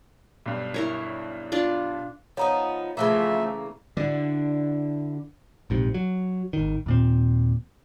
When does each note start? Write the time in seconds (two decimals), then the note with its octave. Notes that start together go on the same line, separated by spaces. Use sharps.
0.46 B1 G2
0.74 E4 A#4 C#5
1.52 D4 F4 D5
2.37 F3 B3 D#4 C#5 A#5
2.97 C#3 E3 F3 A3 A#3 E5
3.97 D3 D4 E4 F#4
5.70 A#1 G#2 C3
5.94 F#3
6.53 G#1 D#3
6.86 D#2 A#2 C4